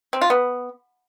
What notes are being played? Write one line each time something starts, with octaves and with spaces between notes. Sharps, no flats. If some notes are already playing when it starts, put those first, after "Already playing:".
C4
F4
B3